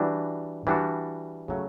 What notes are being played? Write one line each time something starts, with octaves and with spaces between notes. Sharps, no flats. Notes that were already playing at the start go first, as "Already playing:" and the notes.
Already playing: E3 G3 D4 F#4
E3 G3 D4 F#4
C#3 F#3 A3 C#4